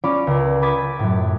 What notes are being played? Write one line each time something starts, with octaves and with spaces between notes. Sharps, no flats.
C#4 F4 D5 B5 D7
C#2 A#4
B5 D6 D#6 G#6 A6 B6
F#2 A2